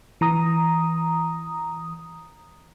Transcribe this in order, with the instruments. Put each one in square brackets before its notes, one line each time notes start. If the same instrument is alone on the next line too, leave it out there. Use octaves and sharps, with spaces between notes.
[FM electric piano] E3 A#5 D#6